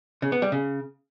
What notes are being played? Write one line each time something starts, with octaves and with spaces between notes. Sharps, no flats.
C#3
B3
G3
C#3